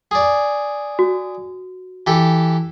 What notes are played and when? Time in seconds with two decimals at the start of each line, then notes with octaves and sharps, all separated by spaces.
0.11 G#4 D5
0.99 F#4
2.07 E3 G4 A4